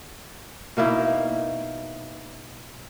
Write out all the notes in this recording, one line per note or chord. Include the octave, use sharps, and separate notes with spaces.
B2 A#3 D#4 E4